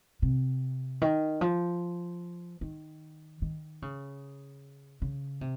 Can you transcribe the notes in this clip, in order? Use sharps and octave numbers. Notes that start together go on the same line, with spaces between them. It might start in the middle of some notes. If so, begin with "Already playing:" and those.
C3
D#3
F3
D#3
D#3
C#3
C#3
C3